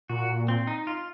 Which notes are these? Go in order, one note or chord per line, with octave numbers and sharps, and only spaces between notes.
A#2 F#4
C4
D#4
F4